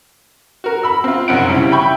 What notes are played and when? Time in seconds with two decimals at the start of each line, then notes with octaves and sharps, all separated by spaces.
0.64 F#4 A#4
0.83 B5 E6
1.04 C4 F4
1.28 F#1 F#2 C4 D#4 F#5 D7
1.48 C#3 G3 E4
1.72 E5 G5 B5 C#6 G6